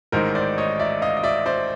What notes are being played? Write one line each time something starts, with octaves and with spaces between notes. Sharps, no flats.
A1 G#2 D#3 A#4 C5
C5 D5
C#5 D#5
D5 E5
D#5 F5
D#5
D5 E5
C5 D5